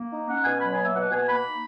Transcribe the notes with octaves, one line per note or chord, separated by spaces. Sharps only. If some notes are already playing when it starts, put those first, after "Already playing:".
Already playing: A#3
D#4
C#4 F#5
B2 G#5
F#3 B5
G#5
A#3
E5
B2 F#5
B2 G#5
A#3 B5
D#4